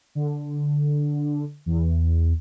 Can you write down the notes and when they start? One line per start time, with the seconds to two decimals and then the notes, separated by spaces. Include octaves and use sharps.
0.15 D3
1.66 E2